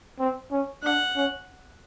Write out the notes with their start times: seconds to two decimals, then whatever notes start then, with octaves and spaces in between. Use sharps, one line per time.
0.19 C4
0.51 C#4
0.83 D4 F#5
1.16 C#4